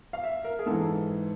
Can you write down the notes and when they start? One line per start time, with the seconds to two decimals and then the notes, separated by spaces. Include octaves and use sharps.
0.13 F5
0.24 E5
0.44 A#4
0.59 G#4
0.66 G#2 E3 A4